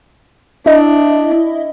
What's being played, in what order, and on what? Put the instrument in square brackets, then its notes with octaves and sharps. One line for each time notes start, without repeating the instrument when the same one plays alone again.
[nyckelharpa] D4 [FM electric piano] E4 D#5 E5